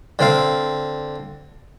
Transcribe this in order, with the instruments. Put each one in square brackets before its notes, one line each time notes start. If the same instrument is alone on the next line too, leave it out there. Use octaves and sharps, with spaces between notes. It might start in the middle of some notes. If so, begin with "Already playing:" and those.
[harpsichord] D3 C4 F5